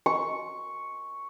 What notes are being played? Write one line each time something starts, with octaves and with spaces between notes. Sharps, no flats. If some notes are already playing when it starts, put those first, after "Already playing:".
C#6